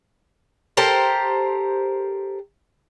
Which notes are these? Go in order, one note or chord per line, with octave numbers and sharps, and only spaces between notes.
G4 A4 A#4 C5